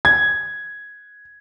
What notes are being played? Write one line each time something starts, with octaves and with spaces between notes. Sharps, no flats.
G#6